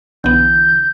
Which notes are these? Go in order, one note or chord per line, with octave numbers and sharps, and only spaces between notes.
B1 D3 E3 B3 G6